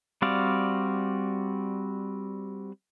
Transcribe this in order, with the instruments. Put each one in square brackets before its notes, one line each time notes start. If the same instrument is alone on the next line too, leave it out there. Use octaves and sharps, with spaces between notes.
[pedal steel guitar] G3 C4 F#4 D5 F5